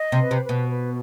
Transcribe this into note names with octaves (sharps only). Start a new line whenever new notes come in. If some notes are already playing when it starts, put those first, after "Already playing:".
Already playing: D#5
C3
B4
C3
B4
B2
B4